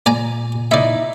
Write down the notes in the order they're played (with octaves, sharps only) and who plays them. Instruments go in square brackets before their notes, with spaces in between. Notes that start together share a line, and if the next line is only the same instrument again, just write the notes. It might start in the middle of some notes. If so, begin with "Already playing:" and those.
[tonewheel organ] A#2 [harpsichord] D5 G#5 A#5
[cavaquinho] D#4 E4 [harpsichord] D5 E5